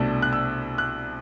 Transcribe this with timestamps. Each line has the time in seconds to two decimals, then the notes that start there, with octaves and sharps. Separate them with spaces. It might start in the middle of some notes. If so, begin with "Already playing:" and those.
Already playing: C2 B2 A3 D4 E6
0.22 F#6
0.33 E6
0.78 F#6